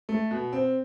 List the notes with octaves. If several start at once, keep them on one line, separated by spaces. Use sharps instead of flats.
A3
B2
C4